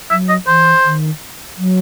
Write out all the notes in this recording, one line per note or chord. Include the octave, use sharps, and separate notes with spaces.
F#3 E5
D#5
E3 C5
D#3
F#3